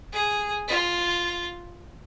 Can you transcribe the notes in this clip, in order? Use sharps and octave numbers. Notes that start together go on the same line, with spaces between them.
G#4
F4